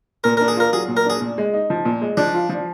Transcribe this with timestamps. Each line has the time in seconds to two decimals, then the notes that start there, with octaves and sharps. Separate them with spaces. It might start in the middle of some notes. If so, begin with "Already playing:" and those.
0.24 A#2 A#4
0.37 D4 A#4
0.48 G#4
0.57 F4 A#4
0.73 F#3 G#4
0.88 A#2
0.97 A#4
1.06 D4 G#4
1.21 A#2
1.38 G#3
1.53 D#4
1.70 F3
1.85 A#2
2.02 G#3
2.17 F3 D4
2.34 F4
2.50 F3